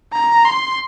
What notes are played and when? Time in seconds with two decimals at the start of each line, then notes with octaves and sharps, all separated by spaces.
0.13 A#5
0.45 C6